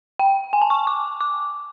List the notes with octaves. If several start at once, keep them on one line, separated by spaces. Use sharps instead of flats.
G5
G#5
A5
C#6
D6
D6